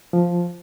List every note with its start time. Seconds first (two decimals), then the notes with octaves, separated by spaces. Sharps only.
0.13 F3